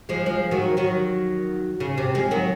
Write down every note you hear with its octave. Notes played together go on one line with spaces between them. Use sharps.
F3 G#3
F3 G#3
D#3 F#3
D#3 F#3
C#3
C3
F3 G#3
D#3 F#3